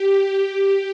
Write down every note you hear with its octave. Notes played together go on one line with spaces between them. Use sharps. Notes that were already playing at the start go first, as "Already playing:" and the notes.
Already playing: G4
G4